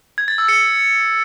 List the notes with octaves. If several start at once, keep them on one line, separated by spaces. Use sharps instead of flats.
G#6
A6
E6
C#7